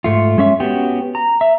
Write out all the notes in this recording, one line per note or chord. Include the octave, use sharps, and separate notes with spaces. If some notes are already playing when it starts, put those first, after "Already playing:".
G#2 A3 F4
G#3 C#4 E5
B3 C#4 F#4 G4
A#5
E5